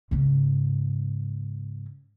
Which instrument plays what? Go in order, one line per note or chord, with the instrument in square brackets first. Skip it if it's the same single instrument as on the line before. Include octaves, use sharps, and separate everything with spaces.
[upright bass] G#2 C#3